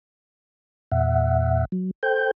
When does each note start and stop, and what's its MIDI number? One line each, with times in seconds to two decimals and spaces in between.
0.92 1.65 40
0.92 1.65 46
0.92 1.65 76
0.92 1.65 78
1.72 1.91 54
2.03 2.31 69
2.03 2.31 72
2.03 2.31 79
2.03 2.31 91